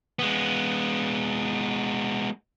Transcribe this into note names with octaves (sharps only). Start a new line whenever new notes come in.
G#3 B3